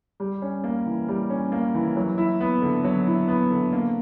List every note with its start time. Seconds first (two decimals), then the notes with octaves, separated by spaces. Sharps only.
0.20 G3
0.42 C#4
0.64 A#3
0.86 E3
1.08 G3
1.30 C#4
1.52 A#3
1.74 E3
1.96 F#3
2.18 E4
2.41 B3
2.62 D3
2.84 F#3
3.07 E4
3.28 B3
3.51 D3
3.73 A#3